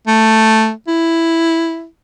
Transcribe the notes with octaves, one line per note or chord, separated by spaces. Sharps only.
A3
E4